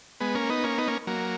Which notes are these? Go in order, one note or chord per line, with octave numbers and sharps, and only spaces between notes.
G#3 B3
A#3 C#4
B3 D#4
A#3 C#4
B3 D#4
A#3 C#4
F#3 A#3